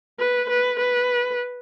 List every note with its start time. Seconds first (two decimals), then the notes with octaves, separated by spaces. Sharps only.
0.19 B4
0.49 B4
0.79 B4